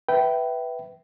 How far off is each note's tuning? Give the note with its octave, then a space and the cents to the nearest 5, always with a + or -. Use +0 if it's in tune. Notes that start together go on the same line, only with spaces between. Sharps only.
B4 +0 E5 +0 G5 -15